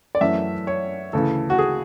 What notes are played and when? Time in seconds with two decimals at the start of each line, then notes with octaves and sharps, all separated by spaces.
0.15 D5
0.21 F#2 E3 A3 C#4 E5
0.67 C#5
1.13 D2 C#3 E3 A4
1.50 F#4
1.59 G#4